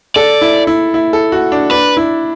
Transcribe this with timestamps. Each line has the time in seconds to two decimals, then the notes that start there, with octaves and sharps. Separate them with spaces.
0.16 A4 D5
0.41 E4
0.67 E4
0.94 E4
1.13 A4
1.32 F#4
1.52 D4
1.71 D4 B4
1.97 E4